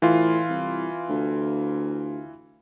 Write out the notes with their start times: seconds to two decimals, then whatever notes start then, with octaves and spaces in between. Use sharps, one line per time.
0.02 A2 E3 F4
0.50 C2
1.09 D2